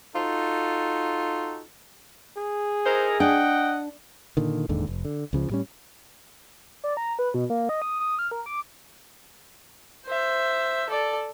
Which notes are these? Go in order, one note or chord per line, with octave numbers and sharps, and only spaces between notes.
D#4 F4 F#4 A4
G#4
D#4 E4 A#4 C5
D4 D#5 F#5 G5
A#2 D3 D#3
D#1 D#2 G#2 D3
F1
D3
C#2 C#3 F3
A2 G3 C#4
D5
A#5
B4
B2
A#3
D#5
D#6
D#6
F6
A#4
D6
C5 E5
A4 D5